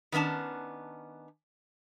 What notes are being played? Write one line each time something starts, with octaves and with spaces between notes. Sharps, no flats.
D#3 B3 C#4 D4 A5